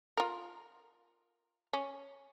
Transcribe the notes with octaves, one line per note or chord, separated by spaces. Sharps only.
F4 A#4
C#4